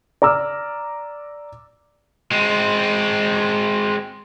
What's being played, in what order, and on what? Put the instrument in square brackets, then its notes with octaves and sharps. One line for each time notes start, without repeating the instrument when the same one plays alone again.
[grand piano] D5 A#5 D6 E6 F6
[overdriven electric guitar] G#3 C4